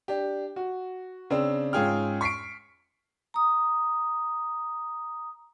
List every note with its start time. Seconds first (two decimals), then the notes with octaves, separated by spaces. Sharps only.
0.08 D4 G4
0.56 F#4
1.30 C#3 C4 D4 E6
1.73 G#2 C#4 F4 G#4 G5 F6
2.21 C#6 B6 C7 D7
3.34 A#5 D#6